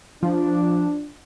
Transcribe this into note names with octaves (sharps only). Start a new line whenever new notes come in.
F3 D4